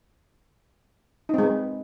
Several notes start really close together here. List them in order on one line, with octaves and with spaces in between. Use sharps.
D#4 C4 G#3 B4